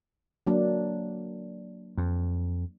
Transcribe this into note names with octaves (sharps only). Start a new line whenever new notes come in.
F#3 A#3 D4
F2